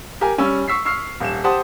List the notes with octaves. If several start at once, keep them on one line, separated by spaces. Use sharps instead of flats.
G4 A#4 G#5
G3 C#4 C#6 E6
C#6 E6 B6 C7
C#6 E6 F6 C7
D#1 E7
G4 C5 F#5 A5 D#6